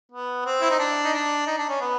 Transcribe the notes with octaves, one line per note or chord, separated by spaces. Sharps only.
B3
C4
E4
D#4
D4
D#4
D4
D#4
D4
C#4
B3